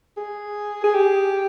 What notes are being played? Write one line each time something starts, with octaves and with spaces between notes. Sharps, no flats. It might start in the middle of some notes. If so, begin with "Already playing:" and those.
G#4
G#4
G4